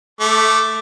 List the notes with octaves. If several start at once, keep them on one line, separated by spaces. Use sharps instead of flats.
A3 D6